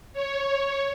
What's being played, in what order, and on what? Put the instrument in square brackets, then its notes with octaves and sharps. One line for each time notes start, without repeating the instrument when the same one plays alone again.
[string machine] C#5